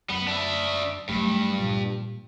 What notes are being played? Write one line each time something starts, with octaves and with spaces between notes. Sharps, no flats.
F#2 B3
D4 E5
G2 F#3 A3
A#2 F3